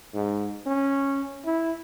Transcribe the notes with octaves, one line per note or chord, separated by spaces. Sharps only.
G#2
C#4
E4